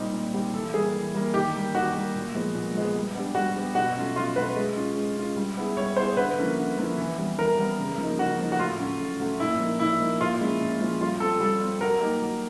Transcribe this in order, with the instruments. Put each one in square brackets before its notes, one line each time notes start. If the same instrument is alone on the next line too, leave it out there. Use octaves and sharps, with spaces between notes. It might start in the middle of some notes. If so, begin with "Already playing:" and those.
Already playing: [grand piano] A#2 G3 C4 D#4 G4
A#2
G3 C4 D#4 G4
[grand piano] E3 [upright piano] A4
[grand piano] G3 A#3 [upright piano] G#4
[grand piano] E3
G3 A#3
[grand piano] D#3 [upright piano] G4
[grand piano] G3 A#3
[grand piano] D#3 [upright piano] F#4
[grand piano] G3 A#3
A#2
F3 G#3 B3
A#2
F3 G#3 B3
G3
B3 D4 G4
[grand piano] G3 [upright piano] F#4
[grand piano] B3 D4 G4
[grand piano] B2 [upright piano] F#4
[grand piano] F#3 A3 C#4 F4
[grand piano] B2 [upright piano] F4
[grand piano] F#3 A3 C#4 F4 [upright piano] B4
[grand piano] G#3
C#4 F4
G#3
C#4 F4
G3
B3 E4 G#4
[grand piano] G3 [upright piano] C#5
[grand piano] B3 E4 G#4 [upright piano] C5
[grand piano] D3 [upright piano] B4
[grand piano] F3 A#3 C#4 E4
D3
F3 A#3 C#4 E4
E3
G3 B3
[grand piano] E3 [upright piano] A#4
[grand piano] G3 B3
C#3
F3 A#3 D#4
[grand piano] C#3 [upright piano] F#4
[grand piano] F3 A#3 D#4
[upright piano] F#4
[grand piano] A2 [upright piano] F4
[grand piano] F#3 A3 C#4
A2
F#3 A3 C#4
[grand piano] A#2 [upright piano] E4
[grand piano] F3 A#3 D#4
[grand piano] A#2 [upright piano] E4
[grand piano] F3 A#3 D#4
[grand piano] A#2 [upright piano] F4
[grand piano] F3 G#3 C#4 E4
A#2
F3 G#3 C#4 E4
[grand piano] G3 [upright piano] F4
[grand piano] C4 F4 [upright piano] A4
[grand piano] G3 [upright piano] A4
[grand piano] C4 F4
[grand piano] F#3 [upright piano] A#4
[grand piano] A#3 D#4 G4
F#3